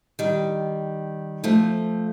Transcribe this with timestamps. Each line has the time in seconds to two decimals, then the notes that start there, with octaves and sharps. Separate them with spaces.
0.19 D#3 G3
1.44 F3 A3